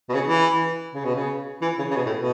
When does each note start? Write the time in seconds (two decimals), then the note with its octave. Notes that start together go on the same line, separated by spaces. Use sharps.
0.09 B2
0.14 C#3
0.26 E3
0.94 C#3
1.05 B2
1.15 C#3
1.62 E3
1.79 C#3
1.91 C#3
1.96 B2
2.06 A2
2.17 B2